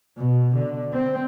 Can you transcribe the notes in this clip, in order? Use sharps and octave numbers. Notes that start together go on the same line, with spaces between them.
B2
D3
C4